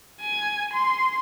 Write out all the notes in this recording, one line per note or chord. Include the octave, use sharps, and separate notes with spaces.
G#5
C6